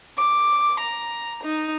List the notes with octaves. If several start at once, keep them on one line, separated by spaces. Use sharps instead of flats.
D6
A#5
D#4